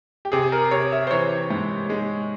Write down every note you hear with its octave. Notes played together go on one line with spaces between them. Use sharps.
G4
C3 G#4
A#4
C3 C#5
E5
C5
E3 C#5
G#2
G#3